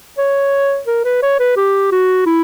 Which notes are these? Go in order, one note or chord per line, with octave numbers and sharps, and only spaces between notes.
C#5
A#4
B4
C#5
B4
G4
F#4
E4